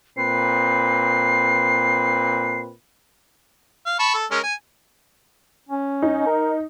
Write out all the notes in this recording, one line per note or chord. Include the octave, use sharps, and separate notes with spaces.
A#2 C4 B4 C7
F5
A5 B5 C#6
A4
G#3 C#4 A#4
G#5
C#4
D#4
A#4